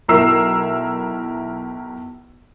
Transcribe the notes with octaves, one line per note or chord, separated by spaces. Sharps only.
B1 E4 A#4 E6 C7